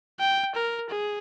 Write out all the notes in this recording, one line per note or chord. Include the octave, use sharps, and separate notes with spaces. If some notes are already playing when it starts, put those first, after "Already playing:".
G5
A#4
G#4